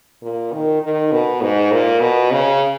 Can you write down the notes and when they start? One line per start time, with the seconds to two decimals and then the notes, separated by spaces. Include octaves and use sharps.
0.23 A#2
0.53 D#3
0.82 D#3
1.12 B2
1.41 G#2
1.72 A#2
2.00 B2
2.31 C#3